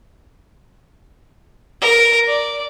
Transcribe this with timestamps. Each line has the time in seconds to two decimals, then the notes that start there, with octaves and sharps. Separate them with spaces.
1.81 A#4
2.27 D5